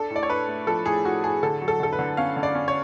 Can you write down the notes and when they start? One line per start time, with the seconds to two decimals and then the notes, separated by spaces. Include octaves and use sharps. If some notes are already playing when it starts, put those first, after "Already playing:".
Already playing: D4 A4
0.11 A2
0.16 D5
0.23 C#5
0.30 D4 B4
0.48 A3
0.67 F3 A4
0.86 A2 G#4
1.04 A2 F#4
1.24 A2 G#4
1.43 D3 A4
1.62 F#3
1.68 A4
1.80 D3 A4
1.93 B4
1.99 D3
2.17 C#4 F5
2.37 D3
2.43 D5
2.55 C#4
2.68 C#5